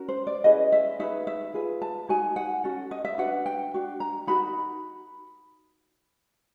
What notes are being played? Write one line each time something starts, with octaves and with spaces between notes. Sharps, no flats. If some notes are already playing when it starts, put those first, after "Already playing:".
Already playing: C#4 F#4 A#4
C5
D5
C#4 E4 G#4 B4 D#5
E5
D#4 G#4 B4 E5
E5
F4 G#4 B4
A5
D#4 F#4 A#4 G#5
F#5
C#4 F#4 A4
D#5
E5
D4 F#4 B4 F#5
G5
D4 F#4
A#5
D#4 F#4 A#4 B5